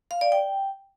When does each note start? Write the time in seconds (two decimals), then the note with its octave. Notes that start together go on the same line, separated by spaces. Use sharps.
0.11 F5
0.21 D5
0.32 G5